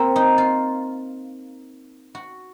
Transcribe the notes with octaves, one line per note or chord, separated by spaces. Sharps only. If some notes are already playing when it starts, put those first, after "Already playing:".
Already playing: A#3 C4
D#4
F4
F#4